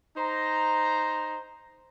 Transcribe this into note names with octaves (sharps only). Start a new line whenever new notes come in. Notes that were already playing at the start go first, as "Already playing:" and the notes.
D#4 C5 A#5